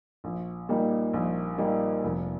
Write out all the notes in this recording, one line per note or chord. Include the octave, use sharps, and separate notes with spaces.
A#1
A#2 G3 A#3 D#4
A#1
A#2 G3 A#3 D#4
F1